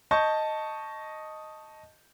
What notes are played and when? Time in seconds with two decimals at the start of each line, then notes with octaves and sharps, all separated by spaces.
0.11 D#5 A5 C#6 G6